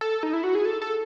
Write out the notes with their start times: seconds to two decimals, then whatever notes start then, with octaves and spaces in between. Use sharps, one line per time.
0.01 A4
0.23 D#4
0.33 E4
0.44 F#4
0.55 G#4
0.65 A4
0.82 A4